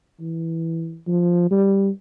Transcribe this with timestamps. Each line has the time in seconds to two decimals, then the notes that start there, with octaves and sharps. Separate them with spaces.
0.21 E3
1.07 F3
1.51 G3